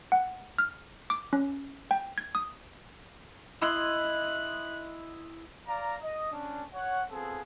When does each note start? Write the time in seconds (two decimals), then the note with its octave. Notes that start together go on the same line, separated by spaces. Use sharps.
0.12 F#5
0.58 F6
1.10 D6
1.33 C#4
1.91 G5
2.18 G#6
2.35 D#6
3.62 E4 D#5 C6 F#6
5.66 D5 F5 A#5
6.01 D#5
6.31 C#4 D4
6.73 C#5 F#5
7.09 B3 C4 F4 G#4 A4